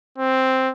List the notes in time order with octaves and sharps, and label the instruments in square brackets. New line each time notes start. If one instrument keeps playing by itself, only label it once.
[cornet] C4